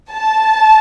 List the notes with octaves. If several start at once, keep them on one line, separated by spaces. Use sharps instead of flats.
A5